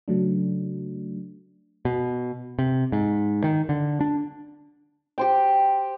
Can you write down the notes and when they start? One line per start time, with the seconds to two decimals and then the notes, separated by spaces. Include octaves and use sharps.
0.08 C#3 F#3 A3 D4
1.85 B2
2.59 C3
2.92 G#2
3.44 D#3
3.69 D3
4.01 D4
5.18 G4 C5 G5